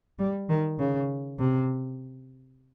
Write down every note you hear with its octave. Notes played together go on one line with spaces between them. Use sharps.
G3
D#3
C#3
C3